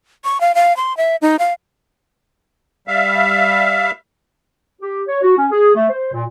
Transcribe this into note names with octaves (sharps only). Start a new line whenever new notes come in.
C#6
F5
F5
C6
E5
D#4
F5
G3 E5 F5
G4
C#5
F#4
C#4
G#4
A3
C5
A#2